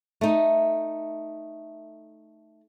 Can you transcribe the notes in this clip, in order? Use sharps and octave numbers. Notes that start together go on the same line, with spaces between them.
A3 D#4